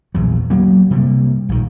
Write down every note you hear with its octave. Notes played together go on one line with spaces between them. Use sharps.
A#1 E2 F#3
F#3 A#3 B3
C3 G3 A#3
A#1 D#3